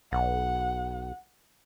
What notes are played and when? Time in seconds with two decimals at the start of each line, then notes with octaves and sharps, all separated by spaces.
0.12 B1 F#5